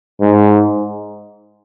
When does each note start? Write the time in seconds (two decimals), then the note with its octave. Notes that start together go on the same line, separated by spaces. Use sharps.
0.21 G#2